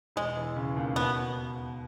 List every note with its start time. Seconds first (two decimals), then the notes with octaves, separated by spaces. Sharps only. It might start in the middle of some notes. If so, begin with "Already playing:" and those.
0.16 E1 G#3
0.37 E3
0.56 C#3
0.76 D#2
0.96 B2 B3